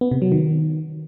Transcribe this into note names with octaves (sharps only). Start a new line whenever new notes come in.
B3
C3
F#3
D#3